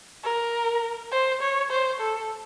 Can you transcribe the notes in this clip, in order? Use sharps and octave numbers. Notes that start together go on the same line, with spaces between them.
A#4
C5
C#5
C5
A4